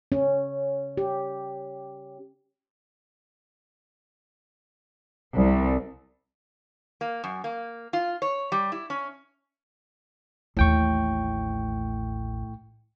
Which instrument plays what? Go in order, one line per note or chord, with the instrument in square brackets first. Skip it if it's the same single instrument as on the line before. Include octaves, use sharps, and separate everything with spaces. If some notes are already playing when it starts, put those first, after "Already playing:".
[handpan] C#4
G4
[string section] C2
[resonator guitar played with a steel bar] A#3
F#2
A#3
F4
C#5
G3
E4
C#4
[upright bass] A1 D#2 [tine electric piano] A2 G5 C#6